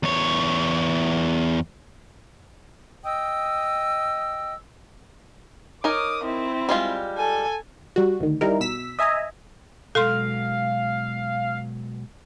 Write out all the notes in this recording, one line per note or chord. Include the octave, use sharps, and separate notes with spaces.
E2 C#5
D#5 G5 D#6 E6
D#4 A#4 C#5 D6 D#6
C4 E4
G3 G#3 F4
A4 G#5
G3 F#4
D2 D#3
G3 D#4 E4 A#4
B2 E6 B6
D#5 E5 G#5 A#5 D#6
B2 F#3 G#3 A4 F5 C6